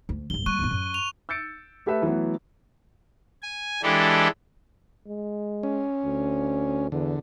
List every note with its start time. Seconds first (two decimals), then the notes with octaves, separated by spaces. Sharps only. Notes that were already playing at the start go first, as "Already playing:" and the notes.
0.09 D2
0.30 C2 G2 G7
0.46 G3 A#3 C#6 F#6 D#7
0.59 E2 B2
0.71 F#2
0.94 F7
1.29 E6 G6 A6 C#7 D7
1.86 A3 G4 A4 B4 E5
2.02 E3 F#3 A3 B3
3.42 G#5
3.83 E3 G#3 D4 G4 A4
5.07 G#3
5.63 C#4
6.04 D2
6.92 E2 D3